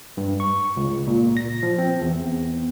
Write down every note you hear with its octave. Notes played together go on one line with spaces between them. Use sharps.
G2
C#6
C#2
A#2
A#6
F3
C4
E2